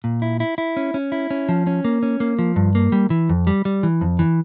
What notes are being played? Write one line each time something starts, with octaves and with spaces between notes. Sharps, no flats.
A#2
E4
E4
E4
C#4
C#4
E4
C#4
F3
C#4
A#3
C#4
A#3
F3
G2
A#3
G3
E3
F2
G3
G3
E3
F2
E3